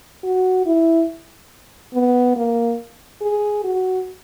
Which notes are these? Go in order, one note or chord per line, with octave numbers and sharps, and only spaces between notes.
F#4
E4
B3
A#3
G#4
F#4